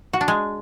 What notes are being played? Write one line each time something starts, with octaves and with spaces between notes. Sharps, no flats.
F#4
D4
G#3